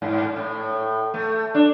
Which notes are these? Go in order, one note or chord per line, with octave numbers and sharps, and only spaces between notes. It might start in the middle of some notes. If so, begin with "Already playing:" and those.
G#2
A2
A3
D4